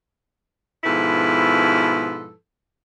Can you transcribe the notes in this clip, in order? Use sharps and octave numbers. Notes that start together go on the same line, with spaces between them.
G#2 B2 F3 E4 A4 B4